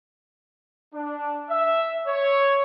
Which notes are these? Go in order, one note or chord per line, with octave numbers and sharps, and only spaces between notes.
D4
E5
C#5